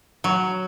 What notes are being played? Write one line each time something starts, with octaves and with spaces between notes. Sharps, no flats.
F#3